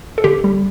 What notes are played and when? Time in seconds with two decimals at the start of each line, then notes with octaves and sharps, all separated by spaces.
0.18 A4
0.24 D3 G4
0.44 G3